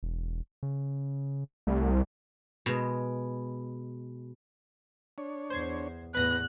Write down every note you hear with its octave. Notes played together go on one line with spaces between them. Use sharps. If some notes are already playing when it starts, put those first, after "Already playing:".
E1
C#3
C2 A3
B2 G#3
D4 C#5
E2 C5 G#6 C7
E2 A2 B3 B4 F#6 A#6